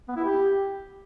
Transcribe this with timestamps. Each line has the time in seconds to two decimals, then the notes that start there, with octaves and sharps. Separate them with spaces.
0.08 B3
0.16 E4
0.24 G4